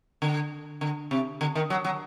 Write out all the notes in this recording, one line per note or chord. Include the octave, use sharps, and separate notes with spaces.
D3
D3
C3
D3
D#3
F#3
F#3